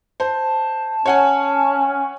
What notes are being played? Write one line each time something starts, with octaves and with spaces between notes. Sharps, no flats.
C5 A5
C#4 C#5 F#5 G#5